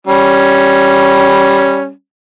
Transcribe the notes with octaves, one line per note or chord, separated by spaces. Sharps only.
G3 C#4